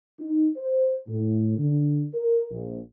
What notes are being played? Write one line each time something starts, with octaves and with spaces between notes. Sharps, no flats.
D#4
C5
A2
D3
A#4
A#1